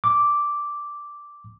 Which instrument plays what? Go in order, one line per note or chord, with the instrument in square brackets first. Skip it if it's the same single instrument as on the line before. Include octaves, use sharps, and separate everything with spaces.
[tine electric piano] D6